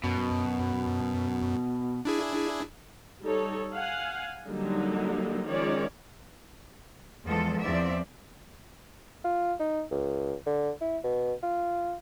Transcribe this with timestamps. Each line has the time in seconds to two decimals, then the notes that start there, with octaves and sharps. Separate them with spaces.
0.04 F#2 B2
2.05 D4 E4 G#4
3.22 G3 D#4 A4 C#5
3.75 F5 F#5 G#5
4.46 D3 F#3 G3 A#3 D#4
5.46 D#3 F3 G#3 C#4 C#5 D5
7.27 E2 F3 G#3 A4
7.61 E2 F3 C4 D5 E5
9.24 F4
9.59 D#4
9.91 C#2
10.46 D3
10.81 E4
11.04 B2
11.43 F4